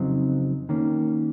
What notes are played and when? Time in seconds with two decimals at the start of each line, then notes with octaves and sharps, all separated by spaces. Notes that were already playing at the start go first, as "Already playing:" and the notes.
Already playing: F2 C#3 F#3 C4 D#4
0.69 D#3 A#3 C#4